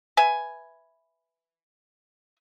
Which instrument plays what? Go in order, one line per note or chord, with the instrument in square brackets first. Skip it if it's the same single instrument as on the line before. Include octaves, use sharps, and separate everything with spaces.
[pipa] B4 E5 G#5